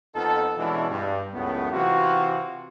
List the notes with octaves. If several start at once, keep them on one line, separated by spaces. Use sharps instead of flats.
F2 B3 D#4 F4 A4
B2 E3 G#3 C#4 D4 E4
G2
C#2 F#2 A2 B3
C3 E3 F4 F#4